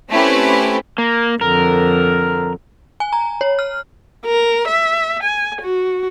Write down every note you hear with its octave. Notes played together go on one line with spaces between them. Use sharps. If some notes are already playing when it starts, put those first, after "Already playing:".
A3 C4 C#4 E4 G4 B4
A#3
F2 D3 A#4
G#5
A#5
C#5
F6
A#4
E5
G#5
F#4